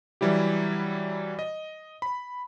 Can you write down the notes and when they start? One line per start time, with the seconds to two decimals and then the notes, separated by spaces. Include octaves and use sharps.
0.21 E3 F#3 G3 E4 G4
1.39 D#5
2.02 B5